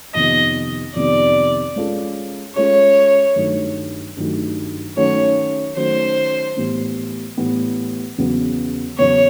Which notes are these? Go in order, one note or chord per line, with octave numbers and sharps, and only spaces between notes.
F2 C3 D#3 G3 B3 D#5
F2 C3 D#3 G3 B3 D5
G#3 C#4 F4 A4
G#3 C#4 F4 A4 C#5
G2 D#3 F#3 A3
G2 D#3 F#3 A3
D#3 F#3 A3 C#4 F#4 C#5
D#3 F#3 A3 C#4 F#4 C5
A2 E3 G3 B3
A2 E3 G3 B3
E2 C#3 F#3 B3
E2 C#3 F#3 B3 C#5